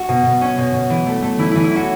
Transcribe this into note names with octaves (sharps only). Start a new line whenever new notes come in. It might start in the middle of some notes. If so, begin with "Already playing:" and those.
Already playing: F#4
B2
B2
C#4
B2
B2
E3
A3
A3
E3 E4
E3 E4
E4
C#4 F#4